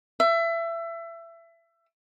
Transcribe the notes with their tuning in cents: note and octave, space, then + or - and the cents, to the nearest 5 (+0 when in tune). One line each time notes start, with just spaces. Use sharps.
E5 +25